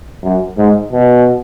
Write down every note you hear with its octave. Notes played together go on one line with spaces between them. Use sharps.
F#2
G#2
B2